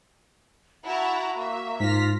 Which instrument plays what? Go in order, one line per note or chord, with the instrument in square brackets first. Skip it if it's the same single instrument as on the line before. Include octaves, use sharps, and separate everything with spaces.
[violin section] E4 A5 A#5 [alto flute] F#4 [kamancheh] F#5
[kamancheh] A#3 [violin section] E5
[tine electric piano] G#2 [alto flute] F4 [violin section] F6 A#6 B6